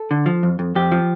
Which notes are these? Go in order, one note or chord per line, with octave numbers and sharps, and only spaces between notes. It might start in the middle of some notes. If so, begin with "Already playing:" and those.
Already playing: A4
D3
F3
F2
F2
F2 G4
F3